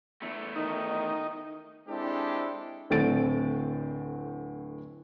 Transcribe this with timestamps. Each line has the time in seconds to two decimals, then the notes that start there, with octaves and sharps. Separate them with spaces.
0.22 E2 A3
0.56 D#3 D#4
1.88 G#3 C4 D4 E4 G4 A4
2.90 D1 A2 D3 C4 A6 D7